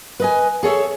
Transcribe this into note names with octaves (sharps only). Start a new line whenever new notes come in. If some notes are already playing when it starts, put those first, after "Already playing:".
B4 D#5 G#5
G#4 A4 C#5 E5